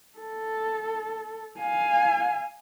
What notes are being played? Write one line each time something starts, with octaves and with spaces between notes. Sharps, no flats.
A4
F5 G#5